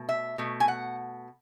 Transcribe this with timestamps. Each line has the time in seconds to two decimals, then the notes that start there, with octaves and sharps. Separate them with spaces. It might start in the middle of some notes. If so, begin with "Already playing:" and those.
Already playing: B2 A3
0.09 E5
0.38 B2 A3
0.60 G#5
0.68 F#5